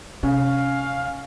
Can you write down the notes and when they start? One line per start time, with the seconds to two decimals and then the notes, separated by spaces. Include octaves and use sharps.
0.23 C3 C#4 F5